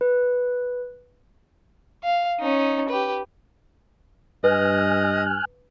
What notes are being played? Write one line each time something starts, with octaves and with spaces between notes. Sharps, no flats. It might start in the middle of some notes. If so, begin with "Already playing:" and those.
B4
F5
C#4 D#4
G4 B4
G2 B4 D#5 G#5 F6 F#6